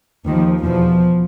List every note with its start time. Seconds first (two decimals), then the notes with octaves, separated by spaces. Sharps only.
0.25 D#2 D#3 F3
0.63 E2 B2 F3